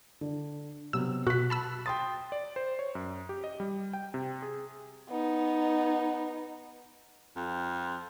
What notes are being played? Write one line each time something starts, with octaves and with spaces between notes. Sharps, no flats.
D3
C3 F#3 B3 E6
B2 F#4 F#6 B6
A5 B5 E6
G5 C6 D#6 A6
D5
C5
C#5
F#2
G4
D#5
G3
G5
C3
G#4
B3 D#4
F2